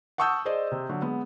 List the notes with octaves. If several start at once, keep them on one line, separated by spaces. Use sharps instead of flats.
F#5 A5 C#6 D#6 E6 G6
G#4 C5 D5 D#5
C3
D3 F#3
G#3 B3